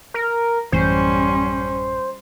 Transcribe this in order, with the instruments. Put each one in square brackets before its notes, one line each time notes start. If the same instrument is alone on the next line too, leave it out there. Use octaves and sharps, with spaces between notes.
[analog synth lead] A#4
[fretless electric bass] A1 F#2 E3 [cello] G3 C#4 [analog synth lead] C5